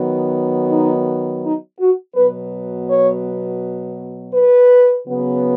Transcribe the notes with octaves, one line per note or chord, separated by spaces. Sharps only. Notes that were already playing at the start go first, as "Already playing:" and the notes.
Already playing: D#3 F#3 B3
D#4
D#4
F#4
B2 F#3 B3 B4
C#5
B4
C#3 F#3 B3